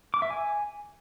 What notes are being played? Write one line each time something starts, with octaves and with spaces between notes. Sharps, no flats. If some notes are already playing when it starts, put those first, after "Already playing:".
D6
E5
G#5